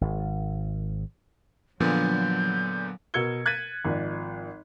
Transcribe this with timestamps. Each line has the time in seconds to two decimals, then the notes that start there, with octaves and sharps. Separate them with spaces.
0.01 G#1
1.80 A#2 D3 F3 F#3 B3 D4 G6
3.14 B2 A#4 E6 G#6 C#7 G7
3.46 F#6 G#6 A6 B6 D#7
3.85 G#1 F3 D5